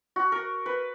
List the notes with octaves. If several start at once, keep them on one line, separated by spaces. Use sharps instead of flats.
F#4
A#4
B4